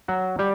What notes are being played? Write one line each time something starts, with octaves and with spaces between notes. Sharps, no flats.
F#3 F#4
G3 G4